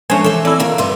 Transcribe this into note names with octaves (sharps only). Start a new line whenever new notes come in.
F3 G#3 A3 C#4 D4 C5 C#5 G#5
E3 A4 E5
A3 C4 E4 D5 E6
F2 D#3 A#3
G2 A3 G4 E5 C6